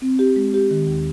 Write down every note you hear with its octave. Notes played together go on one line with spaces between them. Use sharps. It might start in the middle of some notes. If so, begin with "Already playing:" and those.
C4
G4
G#3
G4
D#3
D#2